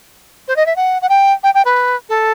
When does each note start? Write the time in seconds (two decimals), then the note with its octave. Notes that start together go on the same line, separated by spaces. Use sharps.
0.48 C5
0.56 D#5
0.66 E5
0.76 F#5
1.02 F#5
1.09 G5
1.43 G5
1.55 G5
1.65 B4
2.09 A4